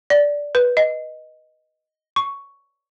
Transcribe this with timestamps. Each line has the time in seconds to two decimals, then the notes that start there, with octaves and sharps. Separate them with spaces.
0.10 D5
0.55 B4
0.77 D#5
2.16 C#6